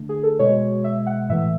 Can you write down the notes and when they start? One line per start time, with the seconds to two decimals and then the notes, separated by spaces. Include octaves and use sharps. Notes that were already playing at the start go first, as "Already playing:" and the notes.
Already playing: D3 A3
0.09 G#4
0.23 A4
0.39 B2 G#3 C#5
0.84 E5
1.07 F#5
1.29 A2 E3 A3 E5